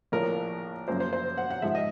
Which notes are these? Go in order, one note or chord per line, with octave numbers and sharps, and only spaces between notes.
A#1 A2 F3 A#4
F#2 C#3 F3 A#3 C#4 C5
C5
C5
F#5
F#5
G#2 F3 G#3 E5
D#5